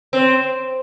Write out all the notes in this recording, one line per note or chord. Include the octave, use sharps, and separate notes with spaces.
C4